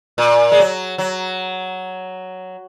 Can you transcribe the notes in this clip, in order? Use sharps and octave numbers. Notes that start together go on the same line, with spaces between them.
A#2
G#3
F#3
F#3